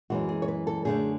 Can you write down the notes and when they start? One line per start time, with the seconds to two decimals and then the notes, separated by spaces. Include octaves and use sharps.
0.10 F#2 E3 G#3 F#4
0.29 G#4
0.42 C#5
0.48 B4
0.67 A4
0.85 F#2 D3 A3 G#4